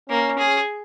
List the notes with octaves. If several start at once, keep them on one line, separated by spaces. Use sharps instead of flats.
A#3 C#4
G#4